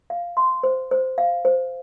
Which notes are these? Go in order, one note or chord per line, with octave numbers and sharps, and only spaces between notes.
F5
C6
C5
C5
F5
C5